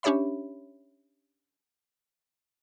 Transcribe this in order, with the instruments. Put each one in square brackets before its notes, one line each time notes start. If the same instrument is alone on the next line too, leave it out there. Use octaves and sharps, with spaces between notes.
[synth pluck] C#4 D4 G4 C#5 E5 B5